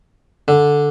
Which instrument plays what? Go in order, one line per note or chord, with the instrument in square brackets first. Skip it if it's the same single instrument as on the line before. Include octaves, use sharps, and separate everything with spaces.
[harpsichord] D3